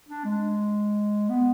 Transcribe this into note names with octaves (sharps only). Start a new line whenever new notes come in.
D4
G#3
B3